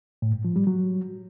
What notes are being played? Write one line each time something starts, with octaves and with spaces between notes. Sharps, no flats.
A2
G#2
F3
G3
F#3